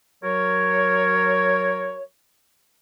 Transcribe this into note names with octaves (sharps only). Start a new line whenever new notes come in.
F#3 A#4 C#5